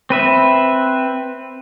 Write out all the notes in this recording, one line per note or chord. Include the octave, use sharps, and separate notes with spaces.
C4 B4 E5